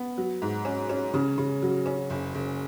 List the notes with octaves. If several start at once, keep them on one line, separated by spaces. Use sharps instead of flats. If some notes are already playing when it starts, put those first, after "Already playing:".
Already playing: B3
F#3
G#2
C#4
C#4
C#3
C#3
F#3
C#4
F#1
F#1